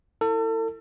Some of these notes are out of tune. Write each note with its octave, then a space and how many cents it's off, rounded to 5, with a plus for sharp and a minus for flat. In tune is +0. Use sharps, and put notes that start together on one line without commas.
E4 +0 A4 +35